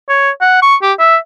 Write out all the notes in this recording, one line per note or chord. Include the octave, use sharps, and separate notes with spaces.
C#5
F#5
C#6
G4
E5